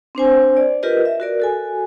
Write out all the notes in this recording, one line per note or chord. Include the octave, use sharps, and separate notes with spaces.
C4 D4 C5 G#5
D5
F4 G4 A#4 B4 D#5
E5
F#4 A#4 D5
F#4 A4 G#5